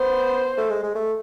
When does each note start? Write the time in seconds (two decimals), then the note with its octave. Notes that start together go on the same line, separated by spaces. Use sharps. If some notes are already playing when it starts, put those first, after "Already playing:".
Already playing: B3 C5
0.58 A3
0.70 G#3
0.83 G#3
0.95 A3